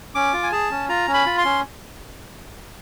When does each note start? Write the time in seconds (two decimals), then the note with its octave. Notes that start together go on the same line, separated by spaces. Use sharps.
0.15 C#4 D6
0.33 F4
0.43 G#5
0.52 G#4 A5
0.71 C#4
0.89 F4 A#5
1.08 C#4
1.14 B5
1.26 F4
1.38 C6
1.45 C#4